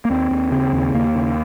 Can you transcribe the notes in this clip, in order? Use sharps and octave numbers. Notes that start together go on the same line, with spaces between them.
A#3
D#2 C4
D#2
C#3 C4
D#2
D#2 A#3
C#3